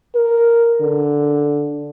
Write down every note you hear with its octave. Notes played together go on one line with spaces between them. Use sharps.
A#4
D3